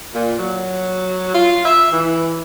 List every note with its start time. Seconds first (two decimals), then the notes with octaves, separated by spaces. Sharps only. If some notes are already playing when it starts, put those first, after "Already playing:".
0.14 A#2
0.38 F#3
1.33 F4
1.65 E5
1.91 E3